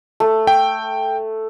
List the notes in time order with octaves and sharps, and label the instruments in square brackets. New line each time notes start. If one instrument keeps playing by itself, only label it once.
[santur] A3
[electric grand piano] G5